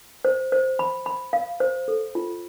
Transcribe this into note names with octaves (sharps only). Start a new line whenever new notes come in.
C5
C5
B5
B5
F5
C5
A4
F4